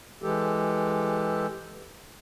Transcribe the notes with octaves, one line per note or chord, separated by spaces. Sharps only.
E3 G#3 G4 A4